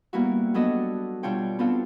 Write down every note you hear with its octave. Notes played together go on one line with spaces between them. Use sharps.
G3 A#3 B3 E4 F#4
F#3 B3 D4 A4 D#5
B2 G3 D4 F4 C#5 G5
B3 C4 D4 F4 A4